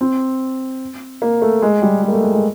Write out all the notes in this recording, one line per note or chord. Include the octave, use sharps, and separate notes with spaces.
C4
A#3
A3
G#3
G3
G#3
A#3
A3
G#3
G#3